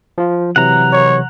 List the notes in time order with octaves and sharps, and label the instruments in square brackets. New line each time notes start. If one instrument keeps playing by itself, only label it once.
[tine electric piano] F3 F4
[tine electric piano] C3 E3 F#3 [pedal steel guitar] F#5 A#5
[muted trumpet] C#5